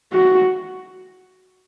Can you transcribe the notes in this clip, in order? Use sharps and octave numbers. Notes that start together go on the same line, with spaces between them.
F#4